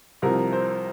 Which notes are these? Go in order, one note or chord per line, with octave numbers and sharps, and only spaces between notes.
C2 C3 F3 A#4
C5